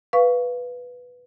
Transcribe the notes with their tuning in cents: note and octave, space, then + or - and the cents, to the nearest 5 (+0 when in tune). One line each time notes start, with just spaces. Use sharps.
B4 +0 F5 +0 C#6 +20